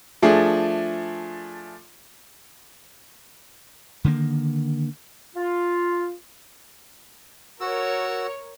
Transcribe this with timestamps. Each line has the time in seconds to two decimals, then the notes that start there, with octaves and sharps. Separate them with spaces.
0.22 F3 A3 D4 G#4
4.04 D3 D#3 G#3 A#3
5.35 F4
7.60 F#4 A#4 C#5 E6